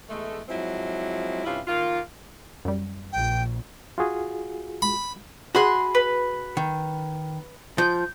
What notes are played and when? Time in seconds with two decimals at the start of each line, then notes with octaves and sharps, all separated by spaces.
0.09 E2 G#3 A3
0.49 F3 F#3 G#3 C4 E4
1.45 G2 C3 C#4 E4 F4
1.68 D#3 A#3 F4
2.65 F#2 G3
3.12 A#1 G5
3.98 F4 F#4 G#4
4.82 B5
5.55 F#4 G#4 B5 C6 F#6
5.95 B4
6.57 D#3
7.78 F3 G6